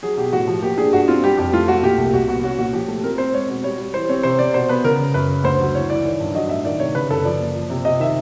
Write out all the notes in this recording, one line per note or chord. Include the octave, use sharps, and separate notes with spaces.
F#3 G#4
B2 G4
A2 F#4
F3
A#3 G4
D4 G#4
G2 F#4
C4 F4
G3 G4
F2 G4
A3 F4
A3 F#4
A#2 G4
C2
C2 F#4
B3 F#4
C#4 F#4
A#2 F#4
F3 G4
A3
C4 A#4
C4 C5
G#3 C#5
B2
G3 C#5
G3
E3 C5
C4 C#5
C3 C5
C3 D5
B2 C5
B3 B4
C#3 A#4
C#3
F#2 B4
C#3
D2 C5
F#3
E3 C#5
E3 D5
D#3
G2
F#3 D#5
A2 E5
D#3 D5
C3 C#5
C#3 B4
F#2 A4
F3 D5
A#3
F3
C3
C3 D#5
D#3 E5